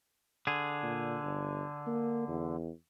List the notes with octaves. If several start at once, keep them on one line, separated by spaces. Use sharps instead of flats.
D3 G#4
A#2
G1
A#3
E2